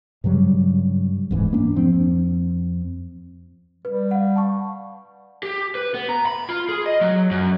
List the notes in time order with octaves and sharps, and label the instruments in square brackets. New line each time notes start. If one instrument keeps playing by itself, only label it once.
[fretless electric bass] G2 C#3 F#3 G3
D1 G#2 E3
A#3 D4
F2 F3 C4
[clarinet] G3 [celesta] B4
[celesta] F5 F#5
A5 C#6
[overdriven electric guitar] G4
B4
B3
A#5
B5
F4
G#4
D#5
F#3
F#2